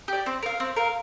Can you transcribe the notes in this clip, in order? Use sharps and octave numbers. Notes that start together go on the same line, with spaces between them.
G4 D5
C4
A#4 F5
C4
A#4 F5